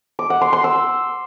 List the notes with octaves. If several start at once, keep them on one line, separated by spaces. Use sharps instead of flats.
D6
F#5
C6
C6
E6